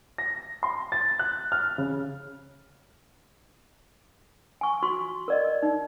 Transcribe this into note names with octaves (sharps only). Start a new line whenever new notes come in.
A#6
C6
A6
F#6
F6
C#3
G#5 C#6
F#4 C6 C#6
A#4 D5 D#5
D#4